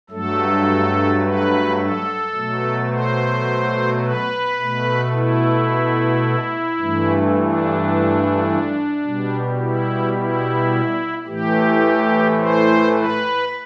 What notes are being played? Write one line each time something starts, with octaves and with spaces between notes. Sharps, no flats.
G2 F#3 A3 A4
B4
A4
B2 F#3 A3
C5
B4
B2 A3
E4
G2 E3 A3
D4
B2 G3
E4
E4
A2 E3 A3 G4
C5
B4